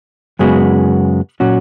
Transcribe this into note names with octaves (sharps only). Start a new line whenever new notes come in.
F#2 C#3 G#3 B3 F#4
A#2 F#3 C#4 F#4